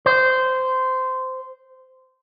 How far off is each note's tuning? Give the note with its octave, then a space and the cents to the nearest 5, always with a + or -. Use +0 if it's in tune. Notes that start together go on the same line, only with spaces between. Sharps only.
C5 -15